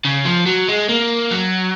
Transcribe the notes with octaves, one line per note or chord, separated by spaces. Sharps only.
C#3
F3
F#3
G#3
A#3
F#3